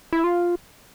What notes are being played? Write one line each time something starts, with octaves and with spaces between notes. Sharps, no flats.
E4
F4